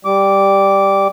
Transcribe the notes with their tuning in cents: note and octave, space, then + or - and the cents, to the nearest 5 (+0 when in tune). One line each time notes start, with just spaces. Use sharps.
G3 +0 D6 -10